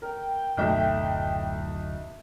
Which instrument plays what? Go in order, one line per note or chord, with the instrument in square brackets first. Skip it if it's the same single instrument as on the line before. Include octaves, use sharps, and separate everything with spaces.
[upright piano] A#4 [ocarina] G5
[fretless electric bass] D1 F#2 A3 [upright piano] B1 E5